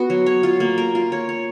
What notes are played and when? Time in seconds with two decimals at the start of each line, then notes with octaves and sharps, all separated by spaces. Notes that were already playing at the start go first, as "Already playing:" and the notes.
Already playing: B3 F#4
0.10 F#3
0.26 C#5
0.43 F4
0.60 A#3
0.78 A#4
0.95 F4
1.12 C#5
1.29 C#5